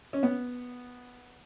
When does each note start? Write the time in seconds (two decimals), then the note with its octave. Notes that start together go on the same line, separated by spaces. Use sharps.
0.13 C#4
0.23 B3